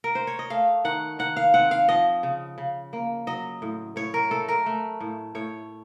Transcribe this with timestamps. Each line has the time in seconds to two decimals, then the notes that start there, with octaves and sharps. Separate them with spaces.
0.04 A#4
0.15 C5
0.27 C#5
0.39 D#5
0.50 A3 F5
0.85 D#3 F#5
1.19 D#3 F#5
1.37 F5
1.54 C4 F#5
1.71 F5
1.89 F3 D#5
2.23 C#3
2.58 C#3
2.93 A#3
3.27 F#3 D#5
3.62 A2
3.96 A2 C#5
4.14 A#4
4.31 A3 A4
4.48 A#4
4.66 A3
5.01 A2
5.35 A2 C#5